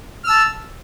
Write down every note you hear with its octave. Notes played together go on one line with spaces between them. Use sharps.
A5 E6 F6